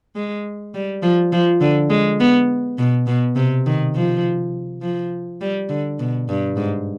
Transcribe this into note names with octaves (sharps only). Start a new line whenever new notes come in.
G#3
G3
F3
F3
D3
G#3
B3
B2
B2
C3
D#3
F3
F3
G3
D3
B2
G2
G#2